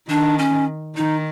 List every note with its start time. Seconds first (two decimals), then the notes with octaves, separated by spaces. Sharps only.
0.09 D#3 D4
0.39 C#4
0.97 D#3 D#4